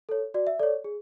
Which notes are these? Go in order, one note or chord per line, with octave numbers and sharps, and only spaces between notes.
A4 C#5
F#4 D5
E5
A4 C#5 D5
G#4